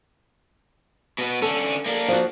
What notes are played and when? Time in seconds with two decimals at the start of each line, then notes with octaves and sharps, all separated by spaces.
1.18 B2 B3
1.42 D3 C#4 A4
1.86 A#3 D4
2.08 F3 F#4